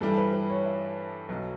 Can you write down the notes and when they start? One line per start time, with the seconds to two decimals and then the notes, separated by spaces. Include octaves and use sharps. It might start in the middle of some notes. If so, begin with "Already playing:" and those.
0.01 G2 E3 G3 A4
0.17 B4
0.33 B4
0.49 C#5
0.65 E5
1.29 B1 B2 F#3